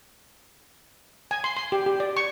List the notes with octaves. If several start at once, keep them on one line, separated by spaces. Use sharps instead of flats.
G#5
C6
C6
G4
G4
D5
C#6